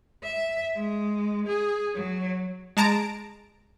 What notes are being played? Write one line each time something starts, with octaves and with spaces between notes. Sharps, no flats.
E5
G#3
G#4
F#3
G#3 A5 A#5 D7